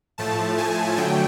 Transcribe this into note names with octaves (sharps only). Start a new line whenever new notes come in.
A2 F3 A3 A5
G#5
D3 F#3 A3 G5